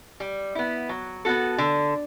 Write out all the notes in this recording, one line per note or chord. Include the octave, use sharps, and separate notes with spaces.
G3
B3 E4
F#3
B3 F#4 A4
D3